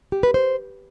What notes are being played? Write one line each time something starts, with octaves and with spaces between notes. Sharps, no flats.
G4
B4
C5